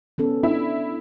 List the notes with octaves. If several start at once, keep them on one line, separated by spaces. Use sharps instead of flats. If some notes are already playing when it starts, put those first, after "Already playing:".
B3 C#4 A4
D4 E4